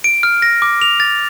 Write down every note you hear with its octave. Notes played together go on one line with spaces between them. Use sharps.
D7
F6
A#6
D6
F7
A6